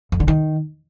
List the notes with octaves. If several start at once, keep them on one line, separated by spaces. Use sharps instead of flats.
F2
D3
D#3